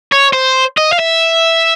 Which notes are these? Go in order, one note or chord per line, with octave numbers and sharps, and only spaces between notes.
C#5
C5
D#5
F5
E5